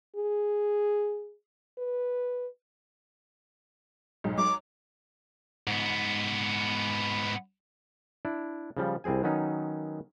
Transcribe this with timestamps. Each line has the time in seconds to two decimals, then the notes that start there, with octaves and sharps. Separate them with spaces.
0.16 G#4
1.78 B4
4.24 B1 G#2 F#3
4.38 F#3 C#5 D6
5.67 G#2 B3
8.25 D4 E4
8.77 C#3 F3 G3
9.04 C2 G3 C4 G#4 G#5
9.23 D#3 F#3 B3 C#4 D#4